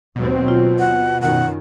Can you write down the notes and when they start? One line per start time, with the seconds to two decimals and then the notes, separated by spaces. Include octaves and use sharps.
0.16 D#2 B2 F#3 C4
0.48 F4
0.79 F#5
1.22 F#2 D#3 F#5